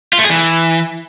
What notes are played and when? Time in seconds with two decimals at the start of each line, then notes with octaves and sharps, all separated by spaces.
0.13 F4
0.19 A3
0.24 G#4
0.30 E3